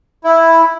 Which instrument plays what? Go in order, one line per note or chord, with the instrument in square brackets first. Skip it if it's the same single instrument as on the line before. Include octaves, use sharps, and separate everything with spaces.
[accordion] E4